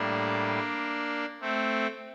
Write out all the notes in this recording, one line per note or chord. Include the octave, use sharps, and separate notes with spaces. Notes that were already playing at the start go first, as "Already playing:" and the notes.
Already playing: A2 G3 A#3 D4
A3 C4